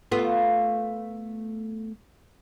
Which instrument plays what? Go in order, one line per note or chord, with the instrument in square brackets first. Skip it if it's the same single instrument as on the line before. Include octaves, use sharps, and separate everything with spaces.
[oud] A3 B3 F4